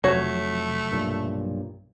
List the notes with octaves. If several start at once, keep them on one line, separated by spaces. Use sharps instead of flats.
F1 C3 F3 F#3 A3 F#4 C#5
B1 G2 A#2